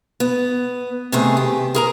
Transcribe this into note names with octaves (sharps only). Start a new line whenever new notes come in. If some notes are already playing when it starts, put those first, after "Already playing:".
B3
C3 D#3 A3 B3 G#4
G4
G#4 A#4 A#5